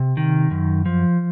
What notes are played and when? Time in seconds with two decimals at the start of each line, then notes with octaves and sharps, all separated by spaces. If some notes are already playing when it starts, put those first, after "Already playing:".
Already playing: C3
0.17 D#3
0.51 F#2
0.86 F3